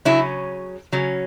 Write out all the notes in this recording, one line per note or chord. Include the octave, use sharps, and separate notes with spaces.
C#3 F#3 C#4 E4
C#3 F#3 C#4